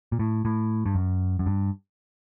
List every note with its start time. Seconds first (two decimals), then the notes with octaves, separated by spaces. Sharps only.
0.12 A#2
0.19 A2
0.45 A2
0.86 G2
0.95 F#2
1.39 F#2
1.46 G2